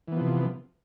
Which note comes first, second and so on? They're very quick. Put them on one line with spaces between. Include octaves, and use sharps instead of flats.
E3 B3 F3 C3